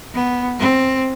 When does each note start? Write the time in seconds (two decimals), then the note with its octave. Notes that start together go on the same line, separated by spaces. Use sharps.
0.15 B3
0.60 C4